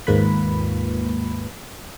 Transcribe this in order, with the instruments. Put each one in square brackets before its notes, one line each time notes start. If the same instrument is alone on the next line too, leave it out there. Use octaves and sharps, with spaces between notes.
[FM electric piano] D#2 G#2 A#3 F4 B4 B5